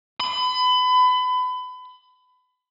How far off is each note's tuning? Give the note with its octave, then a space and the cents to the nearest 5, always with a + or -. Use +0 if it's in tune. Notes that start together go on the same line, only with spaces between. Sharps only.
B5 +30